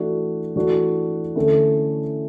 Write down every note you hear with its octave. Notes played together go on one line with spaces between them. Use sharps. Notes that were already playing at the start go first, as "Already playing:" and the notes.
Already playing: E3 A3 D4 F#4
E3 A3 D4 F#4
D3 A3 C#4 E4